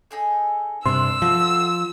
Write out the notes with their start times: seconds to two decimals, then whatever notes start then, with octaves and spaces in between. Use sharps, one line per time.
0.11 D#4 G#4 A4
0.86 G2 C3 D4 A#4 C6 E6
1.22 F3 A3 F#4